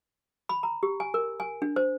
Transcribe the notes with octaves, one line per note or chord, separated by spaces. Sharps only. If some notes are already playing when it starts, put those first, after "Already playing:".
B5
A#5
G4
G#5
A#4
G#5
D4
C5